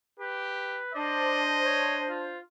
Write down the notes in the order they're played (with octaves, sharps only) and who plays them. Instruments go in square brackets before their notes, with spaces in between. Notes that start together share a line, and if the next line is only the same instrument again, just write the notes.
[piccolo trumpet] G4 [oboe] B4
[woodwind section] D4 C5 [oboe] D5 [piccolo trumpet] D#5
[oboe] C#5
F4